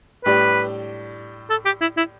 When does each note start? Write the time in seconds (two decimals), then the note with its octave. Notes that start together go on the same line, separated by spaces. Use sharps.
0.25 A2 G3 D4 G4 B4 D5
1.50 A4
1.65 G4
1.81 E4
1.97 E4